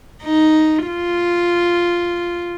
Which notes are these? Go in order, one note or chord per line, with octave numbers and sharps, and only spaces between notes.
D#4
F4